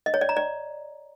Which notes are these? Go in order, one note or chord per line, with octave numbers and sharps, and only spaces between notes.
D#5
C#5
D5
A#5
D5